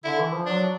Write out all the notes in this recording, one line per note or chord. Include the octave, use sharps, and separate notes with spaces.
D3 E4
E3
F3
F#3 D4